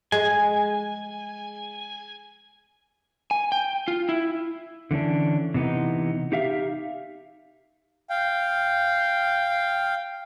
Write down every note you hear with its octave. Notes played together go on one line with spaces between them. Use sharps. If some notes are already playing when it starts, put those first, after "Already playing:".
G#3 G#5
G#5
G5
F4
E4
D3 E3 C#4 D4
C3 E3 B3 D#4
D#4 G4 E5 F5
F5 G5